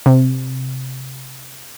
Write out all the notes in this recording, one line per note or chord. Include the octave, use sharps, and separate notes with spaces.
C3